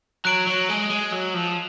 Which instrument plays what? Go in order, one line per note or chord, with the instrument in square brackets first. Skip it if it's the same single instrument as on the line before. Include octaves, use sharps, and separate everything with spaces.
[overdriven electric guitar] F#3 [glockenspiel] F#6 D7 F#7
[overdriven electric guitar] F#3
G#3
G#3
F#3
F3